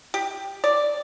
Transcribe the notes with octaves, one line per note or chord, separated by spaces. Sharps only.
G4
D5